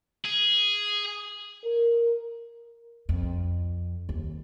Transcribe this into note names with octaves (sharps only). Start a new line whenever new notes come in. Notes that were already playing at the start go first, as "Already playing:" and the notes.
G#4
A#4
F2
D#2